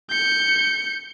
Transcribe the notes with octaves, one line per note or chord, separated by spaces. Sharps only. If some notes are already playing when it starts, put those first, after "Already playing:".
G6 C#7